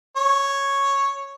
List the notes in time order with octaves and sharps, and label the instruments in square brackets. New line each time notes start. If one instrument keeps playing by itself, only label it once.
[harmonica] C#5